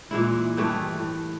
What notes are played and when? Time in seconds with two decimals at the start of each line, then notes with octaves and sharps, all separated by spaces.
0.11 A#2 E3 G#3 E4
0.57 G2 D#3 E3 A3
0.99 A2